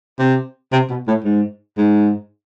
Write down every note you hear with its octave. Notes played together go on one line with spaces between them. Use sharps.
C3
C3
B2
A2
G#2
G#2